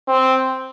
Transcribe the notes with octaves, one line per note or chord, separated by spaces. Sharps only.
C4